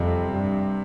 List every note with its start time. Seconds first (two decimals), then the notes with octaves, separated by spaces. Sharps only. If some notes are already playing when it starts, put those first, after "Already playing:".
Already playing: F2 C3 G3 C4
0.32 G2